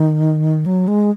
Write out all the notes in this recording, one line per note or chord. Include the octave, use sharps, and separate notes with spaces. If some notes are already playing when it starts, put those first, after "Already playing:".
Already playing: D#3
F#3
G#3